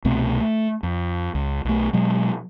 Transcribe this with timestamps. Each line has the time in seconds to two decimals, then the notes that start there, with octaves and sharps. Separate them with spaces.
0.05 C2 B2 A3 C4
0.40 A3
0.83 F2
1.35 C#2
1.65 B1 A3
1.93 B2 F#3 G#3